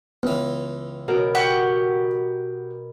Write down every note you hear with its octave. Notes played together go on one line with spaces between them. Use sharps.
C#2 E3 B3
B2 A#4
G4 F#5 C#6